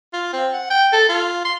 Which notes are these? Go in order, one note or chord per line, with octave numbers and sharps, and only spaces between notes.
F4
C4
F#5
G5
A4
F4
C6